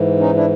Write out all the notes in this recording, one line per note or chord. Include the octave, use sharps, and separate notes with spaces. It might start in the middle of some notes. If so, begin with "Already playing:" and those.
Already playing: G#2 E3
C#4 D#4
D4 E4